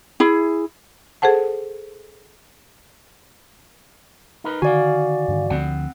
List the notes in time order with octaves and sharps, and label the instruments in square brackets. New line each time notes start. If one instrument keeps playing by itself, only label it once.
[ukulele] E4 G#4
[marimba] G#4 A4 C5 F#5 A5
[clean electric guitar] D#4 A#4 B4
[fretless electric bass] D3 D#3 [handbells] F#4 D5 [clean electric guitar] F5 G#5
[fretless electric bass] G2 D3 D#3
[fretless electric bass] D2 D3 F3 [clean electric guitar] C4 F#5